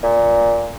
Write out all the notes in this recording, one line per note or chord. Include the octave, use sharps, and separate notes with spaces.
A#2